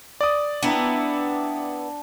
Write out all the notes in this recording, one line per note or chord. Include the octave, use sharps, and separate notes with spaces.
D5 D#6
B3 D4 E4 G5 A#5